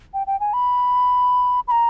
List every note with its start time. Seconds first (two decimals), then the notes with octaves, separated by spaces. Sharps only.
0.14 G5
0.27 G5
0.40 G#5
0.53 B5
1.68 B5
1.71 A#5